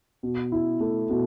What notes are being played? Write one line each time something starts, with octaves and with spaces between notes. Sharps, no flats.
B2
E4
A3
B2